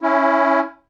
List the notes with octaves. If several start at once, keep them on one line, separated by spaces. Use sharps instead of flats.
C#4 E4